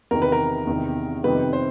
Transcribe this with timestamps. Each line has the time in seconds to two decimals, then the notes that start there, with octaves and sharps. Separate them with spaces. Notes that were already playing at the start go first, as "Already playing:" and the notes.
0.11 E2 C3 D#3 A#4
0.22 B4
0.32 A#4
0.67 E2 C3 D#3
1.24 F2 C3 D#3 G3 B3 B4
1.53 C5